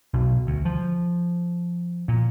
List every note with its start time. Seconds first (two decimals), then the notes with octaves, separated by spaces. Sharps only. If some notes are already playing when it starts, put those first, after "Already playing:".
0.13 B1
0.47 D2
0.65 F3
2.08 A#2